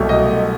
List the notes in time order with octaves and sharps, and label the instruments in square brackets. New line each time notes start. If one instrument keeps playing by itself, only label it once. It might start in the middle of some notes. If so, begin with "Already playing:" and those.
Already playing: [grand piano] C2 B2 F#3 A3
D#5